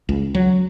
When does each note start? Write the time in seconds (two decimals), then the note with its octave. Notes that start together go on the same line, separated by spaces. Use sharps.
0.09 C#2
0.35 F#3